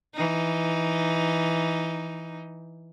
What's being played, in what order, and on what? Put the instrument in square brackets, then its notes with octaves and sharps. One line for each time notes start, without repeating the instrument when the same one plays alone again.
[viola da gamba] E3 D#4